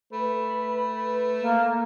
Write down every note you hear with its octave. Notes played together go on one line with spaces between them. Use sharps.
A3 B4 B5
A#3